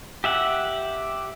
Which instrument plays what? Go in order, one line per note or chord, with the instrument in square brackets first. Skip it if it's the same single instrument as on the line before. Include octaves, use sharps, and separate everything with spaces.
[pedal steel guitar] G4 E5 F#5